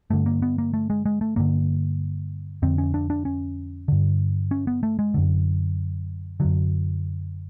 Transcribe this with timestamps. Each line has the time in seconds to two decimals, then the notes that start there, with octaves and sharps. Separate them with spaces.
0.10 G2 D3 A3
0.26 A#3
0.42 B3
0.58 A#3
0.74 A3
0.90 G#3
1.06 G#3
1.21 A3
1.36 G2 D3 A#3
2.62 F2 D3 C4
2.78 C#4
2.94 D4
3.10 D4
3.25 C#4
3.88 G2 D3
4.51 C#4
4.67 B3
4.83 A3
4.99 G#3
5.14 F#2 D3
6.40 F#2 D3 F#3